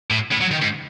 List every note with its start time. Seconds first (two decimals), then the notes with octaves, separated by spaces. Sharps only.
0.10 A2
0.31 A2
0.41 F#3
0.51 D#3
0.62 G#2